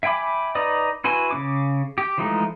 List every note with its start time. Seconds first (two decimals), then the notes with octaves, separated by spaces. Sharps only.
0.03 E5 G5 G#5 B5 D6
0.55 D#4 B4 D5 D#5
1.04 E4 F#4 B4 G#5 C6
1.31 C#3 C#4 D6
1.98 G4
2.18 E3 F3 G#3 A3 D#4